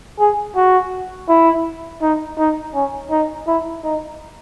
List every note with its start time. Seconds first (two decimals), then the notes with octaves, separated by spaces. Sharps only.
0.19 G#4
0.56 F#4
1.29 E4
2.02 D#4
2.38 D#4
2.74 C#4
3.11 D#4
3.47 E4
3.83 D#4